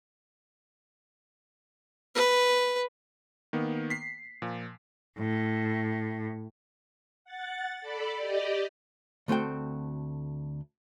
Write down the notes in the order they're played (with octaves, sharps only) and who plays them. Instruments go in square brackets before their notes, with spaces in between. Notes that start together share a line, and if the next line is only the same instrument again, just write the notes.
[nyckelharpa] B4
[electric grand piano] D#3 A#3 B3
B6 C7
A#2 F3
[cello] A2
[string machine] F#5 A6
A4 D5 B5
G4 D5 D#5
[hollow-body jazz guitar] D2 A3 C4 F#4 G5